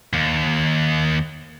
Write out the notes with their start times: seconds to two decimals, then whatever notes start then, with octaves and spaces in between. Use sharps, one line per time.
0.13 D#2